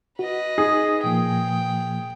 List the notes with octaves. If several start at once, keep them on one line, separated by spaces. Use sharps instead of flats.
F#4 B4 D#5
D#4 G#4
A#2 F3 A#3 G5